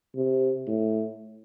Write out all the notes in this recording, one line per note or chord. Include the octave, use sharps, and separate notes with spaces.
C3
A2